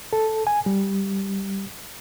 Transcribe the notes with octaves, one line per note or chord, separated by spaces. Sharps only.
A4
G#5
G3